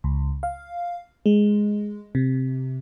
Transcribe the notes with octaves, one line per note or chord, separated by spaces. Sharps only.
C#2
F5
G#3
C3